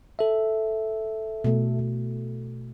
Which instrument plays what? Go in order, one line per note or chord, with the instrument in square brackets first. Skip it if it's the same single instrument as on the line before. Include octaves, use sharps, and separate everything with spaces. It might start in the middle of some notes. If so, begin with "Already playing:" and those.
[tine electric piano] A4 E5
[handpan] B2 A3